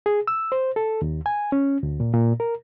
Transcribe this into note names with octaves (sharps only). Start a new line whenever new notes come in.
G#4
E6
C5
A4
D#2
G#5
C#4
D2
A#2
A#2
A#4